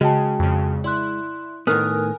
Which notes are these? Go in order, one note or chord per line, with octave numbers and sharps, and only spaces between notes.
C#3 G#3 F#4 G5 A5
F2 C#3
E4 D5 C6 F#6
A2 D#3 B3 A#4 G#5 D#6 F6 F#6